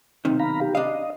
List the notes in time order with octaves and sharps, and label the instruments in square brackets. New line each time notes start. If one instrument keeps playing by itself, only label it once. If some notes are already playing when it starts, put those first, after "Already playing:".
[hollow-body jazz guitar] B1 C3 D#3
[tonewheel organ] F5 A#5 B5
G4
[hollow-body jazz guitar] D4 F5 [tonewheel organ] D#5